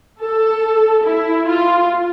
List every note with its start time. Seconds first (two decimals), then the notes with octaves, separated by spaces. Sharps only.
0.19 A4
1.04 E4
1.47 F4